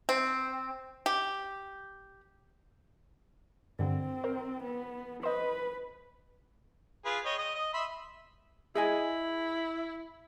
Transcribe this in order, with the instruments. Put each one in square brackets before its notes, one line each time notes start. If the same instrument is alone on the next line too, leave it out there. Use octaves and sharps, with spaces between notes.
[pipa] C4
G4
[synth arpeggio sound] G2 D3 [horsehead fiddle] C4
[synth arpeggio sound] A#4 C5
[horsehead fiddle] B3
[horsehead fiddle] B4 [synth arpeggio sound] C5 D#5
[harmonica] F4 G#4 B4
C#5 D#5 G5
D#5
D#5
E5 B5 C6
[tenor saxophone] E4 [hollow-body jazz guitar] G#4 D#5 G#5